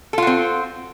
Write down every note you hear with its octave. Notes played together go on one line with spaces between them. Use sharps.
C4 F4 F#4 A4